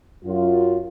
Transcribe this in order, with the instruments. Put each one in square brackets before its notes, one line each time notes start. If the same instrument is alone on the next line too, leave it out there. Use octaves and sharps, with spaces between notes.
[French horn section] F#2 F4